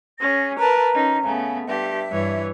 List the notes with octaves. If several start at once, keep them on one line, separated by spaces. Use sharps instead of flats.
C#4 G#4 A#6
A#4 B4 A5 A#5
C#4 D#4
C#3 A3 B3
G2 G4 E5
G2 E3 C#5